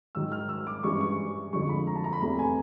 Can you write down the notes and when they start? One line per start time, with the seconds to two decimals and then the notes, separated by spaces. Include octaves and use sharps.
0.15 G#2 D#3 F#3 E6
0.32 F6
0.49 E6
0.67 D6
0.83 G2 E3 G#3 C#4 C#6
1.00 C#6
1.53 F2 D3 F3 G#3 C#6
1.69 B5
1.87 A#5
1.96 A5
2.04 A#5
2.13 B5
2.21 E2 C3 E3 A3 A#5
2.39 G#5